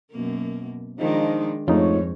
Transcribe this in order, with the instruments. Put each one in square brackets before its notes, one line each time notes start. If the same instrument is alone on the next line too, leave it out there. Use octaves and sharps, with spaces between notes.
[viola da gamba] F#2 B2 A#3
[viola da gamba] D#3 G#3 D4 [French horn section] F3 D#4
[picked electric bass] F2 [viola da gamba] G#2 [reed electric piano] A3 D#4 F4 [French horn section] C#5